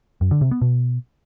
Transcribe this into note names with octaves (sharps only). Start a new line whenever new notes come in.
F#2
D3
C3
B3
B2